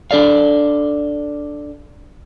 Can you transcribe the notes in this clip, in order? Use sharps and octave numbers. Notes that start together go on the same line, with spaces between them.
D4 A4 D5 F5